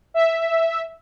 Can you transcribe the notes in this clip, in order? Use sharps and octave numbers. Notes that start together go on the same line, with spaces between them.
E5